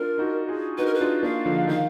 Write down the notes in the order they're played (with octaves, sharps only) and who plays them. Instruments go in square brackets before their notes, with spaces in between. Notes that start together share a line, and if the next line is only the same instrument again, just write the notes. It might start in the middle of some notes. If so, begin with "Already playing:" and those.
Already playing: [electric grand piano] D4 F4 [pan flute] A#4
[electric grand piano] D#4 F#4
F4 G#4
[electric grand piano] D#4 F#4 [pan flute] B4
[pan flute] A#4
B4
[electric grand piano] D4 F4
[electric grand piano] A#3 D4 [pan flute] F5
[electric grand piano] D3 F3
[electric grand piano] D#3 [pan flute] F5